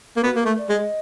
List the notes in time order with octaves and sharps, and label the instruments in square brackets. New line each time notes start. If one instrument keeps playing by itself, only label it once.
[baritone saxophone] A#3
[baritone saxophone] B3 [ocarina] F#4
[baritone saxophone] A#3 [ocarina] A#4
[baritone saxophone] A3
[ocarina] D5
[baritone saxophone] G#3
[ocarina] D#5